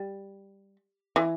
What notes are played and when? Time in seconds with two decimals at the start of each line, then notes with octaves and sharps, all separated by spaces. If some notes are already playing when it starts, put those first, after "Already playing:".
Already playing: G3
1.16 E3